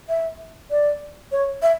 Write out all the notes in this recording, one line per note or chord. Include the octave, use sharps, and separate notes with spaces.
E5
D5
C#5
E5